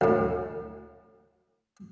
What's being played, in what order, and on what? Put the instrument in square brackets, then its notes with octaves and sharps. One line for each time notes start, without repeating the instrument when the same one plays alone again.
[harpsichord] D2 A2